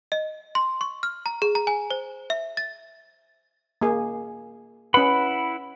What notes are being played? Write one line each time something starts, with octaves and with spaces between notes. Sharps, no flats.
D#5
C6
C#6
F6
A#5
G#4
A#5
G#5
C5
E5
A6
A#3 G#4
C#4 E4 B4 F#5 B5